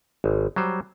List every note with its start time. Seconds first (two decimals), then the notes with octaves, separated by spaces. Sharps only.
0.24 G#1
0.56 F#3 G3 C5